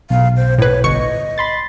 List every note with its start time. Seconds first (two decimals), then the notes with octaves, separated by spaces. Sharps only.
0.10 B1 F5
0.36 C5
0.58 A2 B4 C#5
0.84 G1 D#5 C#6 C#7
1.38 B5 C6 A6